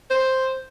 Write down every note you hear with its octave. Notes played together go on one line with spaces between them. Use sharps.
C5